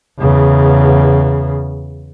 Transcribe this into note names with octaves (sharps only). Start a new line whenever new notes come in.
E2 C#3